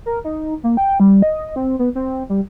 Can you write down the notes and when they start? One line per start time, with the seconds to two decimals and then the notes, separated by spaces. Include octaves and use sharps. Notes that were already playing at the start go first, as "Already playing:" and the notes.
0.06 A#4
0.24 D#4
0.63 A#3
0.77 G5
1.00 G3
1.22 D#5
1.56 C4
1.79 B3
1.95 C4
2.29 G3